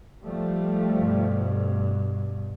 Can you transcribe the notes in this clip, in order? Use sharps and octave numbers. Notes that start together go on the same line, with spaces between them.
F3 G3 A3
G2 B2